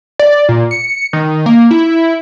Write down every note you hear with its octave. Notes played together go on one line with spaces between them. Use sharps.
D5
A#2
C#7
D#3
A#3
E4